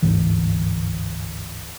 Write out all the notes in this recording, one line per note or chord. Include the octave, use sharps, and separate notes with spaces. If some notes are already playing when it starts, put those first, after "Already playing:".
G1 D2 G#2 E3